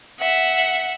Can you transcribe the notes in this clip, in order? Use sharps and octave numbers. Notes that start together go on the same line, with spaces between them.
E5 F#5